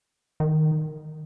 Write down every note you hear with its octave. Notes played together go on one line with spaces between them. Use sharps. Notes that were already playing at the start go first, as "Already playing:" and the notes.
D#3